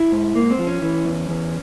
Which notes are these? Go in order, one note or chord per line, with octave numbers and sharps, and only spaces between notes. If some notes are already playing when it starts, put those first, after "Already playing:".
Already playing: E4
G#2
G#2 A#3
C4
F3
C#4
E3
E2
E2